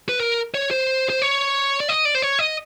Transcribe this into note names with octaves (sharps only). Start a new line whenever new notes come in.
B4
A#4
C#5
C5
C5
C#5
D5
D#5
D5
C5
C#5
D#5